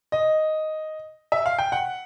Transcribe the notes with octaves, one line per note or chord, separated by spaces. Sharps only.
D#5
E5
F5
G5
F#5